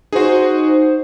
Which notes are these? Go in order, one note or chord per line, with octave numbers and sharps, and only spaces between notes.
D#4 F#4 G#4 C5